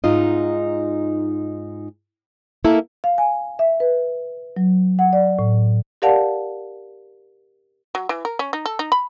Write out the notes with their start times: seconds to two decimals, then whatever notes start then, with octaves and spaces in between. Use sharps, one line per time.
0.04 G#2 D#4 F4 D#5
2.64 A#3 E4 A4 A#4
3.04 F5
3.18 G#5
3.59 E5
3.80 B4
4.57 F#3
4.99 F#5
5.13 D5
5.39 A2
6.02 G4 A#4 D5 F5 F#5 A5
7.95 F#3
8.09 E3
8.25 A#4
8.39 C#4
8.53 D#4
8.66 A4
8.79 D#4
8.92 B5